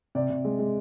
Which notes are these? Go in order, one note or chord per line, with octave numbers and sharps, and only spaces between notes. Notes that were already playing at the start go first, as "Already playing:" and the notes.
C3 D5
C3
G#3
G#3